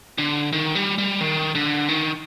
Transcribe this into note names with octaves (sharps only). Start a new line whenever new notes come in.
D3
D#3
G3
G3
D#3
D3
D#3